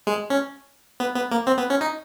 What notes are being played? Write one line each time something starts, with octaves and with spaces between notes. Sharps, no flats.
G#3
C#4
B3
B3
A#3
C4
B3
C#4
D#4